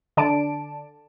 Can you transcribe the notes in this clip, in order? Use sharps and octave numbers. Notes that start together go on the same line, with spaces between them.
D3 D5 A5 D7